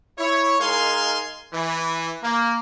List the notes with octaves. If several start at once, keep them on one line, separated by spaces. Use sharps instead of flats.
E4 C#5
G#3 D#4 A#4 F5 G#5 C6
E3
A#3